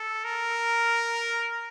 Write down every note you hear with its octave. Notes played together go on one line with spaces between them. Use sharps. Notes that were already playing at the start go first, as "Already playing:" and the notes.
Already playing: A4
A#4